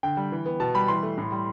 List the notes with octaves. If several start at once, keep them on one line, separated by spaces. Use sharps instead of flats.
D3 G5
G3
E3
B3
B2 A5
G3 B5
E3 C6
A3
A2
G3